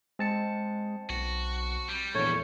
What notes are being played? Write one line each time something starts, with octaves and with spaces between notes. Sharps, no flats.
G#3 C4 A5 C#7
B1 F#4
G3
A#1 E2 A3 C#5